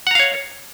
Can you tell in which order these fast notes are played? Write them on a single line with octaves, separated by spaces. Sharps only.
F#5 A#5 F5 C#5